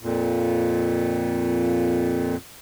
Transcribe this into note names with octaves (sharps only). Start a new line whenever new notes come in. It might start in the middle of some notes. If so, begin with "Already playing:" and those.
F2 A#2